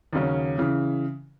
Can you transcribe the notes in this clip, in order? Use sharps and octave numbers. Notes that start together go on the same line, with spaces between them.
D#2 C#3 F#3 C#4
C#3 E3